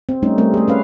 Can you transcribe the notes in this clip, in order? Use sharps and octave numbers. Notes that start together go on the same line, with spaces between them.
C4
G3 A3 C#4 D#4
G3 A3 C4 A#4
A3 G#4
C#4 B4 F5